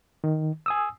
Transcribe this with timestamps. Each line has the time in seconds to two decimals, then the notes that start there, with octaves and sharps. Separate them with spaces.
0.24 D#3
0.66 G#5 D#6 E6